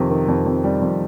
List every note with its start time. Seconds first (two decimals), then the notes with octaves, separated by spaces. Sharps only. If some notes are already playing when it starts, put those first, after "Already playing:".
Already playing: F2 C3 D#3
0.10 D#3
0.28 F2
0.46 F2
0.64 G3
0.82 F2